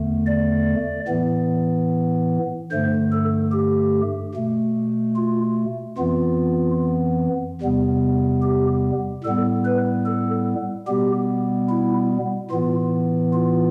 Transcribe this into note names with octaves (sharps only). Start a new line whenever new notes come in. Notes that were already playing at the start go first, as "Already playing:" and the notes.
Already playing: E2 D3 A3
D5
A2 E3 B3
G2 D3 A3 C5
A4
G4
B2 A3
F4
F2 E3 B3 F4
E2 C3 G3 B3
G4
A2 G3 B3 A4
B4
A4
B2 G3 B3 G4
E4
A2 E3 B3 F4
F4